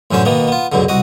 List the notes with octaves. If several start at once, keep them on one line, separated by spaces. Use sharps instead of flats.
A1 F#2 D3 C#4 C5
B2 D#3 A#3 B3
B3 F4
C#2 F#2 B2 D3
C2 F#4 D#5